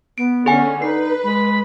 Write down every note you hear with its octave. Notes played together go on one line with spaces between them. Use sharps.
B3 D7
D3 C#4 G#4 F#5 G#5
D#4 B4 C7
G#3 B5